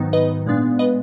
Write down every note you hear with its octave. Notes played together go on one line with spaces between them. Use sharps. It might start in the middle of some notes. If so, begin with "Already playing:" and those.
Already playing: G#2 D#3 F#3 B3 D#4
B4 D#5
A#2 G#3 B3 D4
B4 D#5